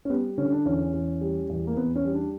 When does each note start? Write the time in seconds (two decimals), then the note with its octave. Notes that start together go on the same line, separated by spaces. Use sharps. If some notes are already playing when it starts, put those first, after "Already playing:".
0.05 C#4
0.10 G3 B3
0.38 D3 C#4
0.52 D4
0.65 E2 C#4
0.93 E2
1.21 G3
1.49 E2
1.67 A#3
1.77 E2 B3
1.96 C#4
2.05 G3
2.14 D4